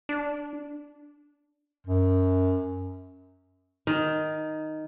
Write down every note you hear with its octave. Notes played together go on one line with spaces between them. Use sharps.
D4
F#2
D#3